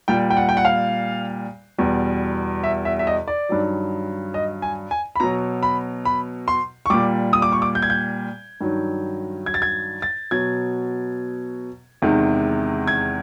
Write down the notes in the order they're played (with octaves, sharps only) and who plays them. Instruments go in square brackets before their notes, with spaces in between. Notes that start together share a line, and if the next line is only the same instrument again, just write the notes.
[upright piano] A#2 G3 G5
G5
F#5
G5
F#5
F5
E2 B2 G3
E5
E5
E5
D#5
D5
G2 D#3 F#3
D#5
G#5
G#5
B5
B2 F#3 A#5
B5
B5
C6
C#6
A#2 G3 D6
D#6
D6
C#6
D6
G6
G#6
G6
G2 D#3 F#3
G#6
A6
G#6
A6
B2 F#3 G#6
E2 C3 D#3 G#3
G#6